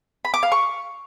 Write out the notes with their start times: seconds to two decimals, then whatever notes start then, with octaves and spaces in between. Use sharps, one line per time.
0.25 B5
0.34 D6
0.43 F5
0.52 C#6